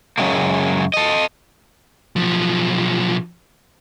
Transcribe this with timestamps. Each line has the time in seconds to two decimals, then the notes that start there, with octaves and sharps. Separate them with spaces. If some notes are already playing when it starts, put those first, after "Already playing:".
0.18 F#2 C#3 F#3 G#3 A#3
0.94 A4 D#5
2.16 B1 F3